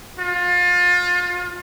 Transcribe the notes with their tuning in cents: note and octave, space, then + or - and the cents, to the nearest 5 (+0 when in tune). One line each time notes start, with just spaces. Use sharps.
F4 +30